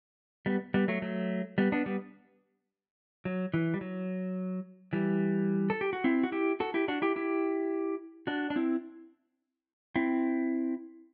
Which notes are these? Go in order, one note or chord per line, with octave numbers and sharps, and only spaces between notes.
G3 B3
G3 B3
F#3 A3
F#3 A3
G3 B3
B3 D4
G3 B3
F#3
E3
G3
F#3
E3 G3
A4
G4
F#4
C4 E4
F#4
E4 G4
F#4 A4
E4 G4
D4 F#4
E4 G4
E4 G4
D4 F#4
D4
C4 E4
C4 E4